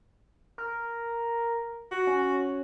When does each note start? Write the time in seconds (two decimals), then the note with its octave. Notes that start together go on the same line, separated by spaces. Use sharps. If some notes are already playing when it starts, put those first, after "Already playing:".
0.58 A#4
1.92 F#4
2.07 C#4